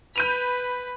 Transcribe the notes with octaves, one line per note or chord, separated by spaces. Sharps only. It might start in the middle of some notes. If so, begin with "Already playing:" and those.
B4 B5 G6 D#7 F7